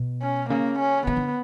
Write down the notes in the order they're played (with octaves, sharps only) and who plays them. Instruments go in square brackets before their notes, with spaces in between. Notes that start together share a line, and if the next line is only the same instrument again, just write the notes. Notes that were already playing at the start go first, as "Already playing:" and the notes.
Already playing: [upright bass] B2
[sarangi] C#4
[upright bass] C#3 [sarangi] A#3
[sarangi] C#4
[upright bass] C#3 [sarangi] B3
[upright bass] D3